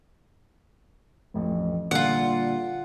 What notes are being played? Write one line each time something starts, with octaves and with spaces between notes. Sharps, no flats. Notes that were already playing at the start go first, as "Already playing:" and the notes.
A1 F2 A2
A#2 D3 G3 F4 F#5